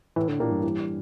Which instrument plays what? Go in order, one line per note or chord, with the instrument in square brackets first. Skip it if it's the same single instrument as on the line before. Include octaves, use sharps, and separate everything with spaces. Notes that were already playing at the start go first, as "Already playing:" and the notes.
[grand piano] A2 [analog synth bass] E3
[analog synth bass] D3
[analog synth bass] A#2 [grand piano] E3 A#3 D4 G4
[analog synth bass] G2
[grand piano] E3